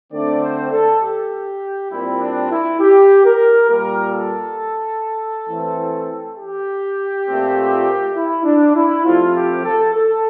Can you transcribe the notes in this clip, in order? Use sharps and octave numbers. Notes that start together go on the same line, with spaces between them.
D3 A3 C4 D5
C5
A4
G4
A#2 G3 C4 E4
D4
E4
G4
A#4
A#2 G3 A#3 A#4
A4
E3 A3 C4
G4
A#2 A3 C4
E4
D4
E4
C3 F3 A3 C4 F4
G4
A4
A4